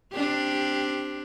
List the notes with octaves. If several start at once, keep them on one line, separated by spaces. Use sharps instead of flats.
C4 D4 G4